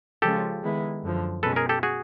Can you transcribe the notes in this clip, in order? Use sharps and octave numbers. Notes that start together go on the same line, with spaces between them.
C#3 F3 G#3 C#4 F4 G4 A4
D#3 G#3 B3 E4
F#2 D3 F3
B2 G#3 C#4 A4 B4
G#4 A#4
G4 A4
F#4 G#4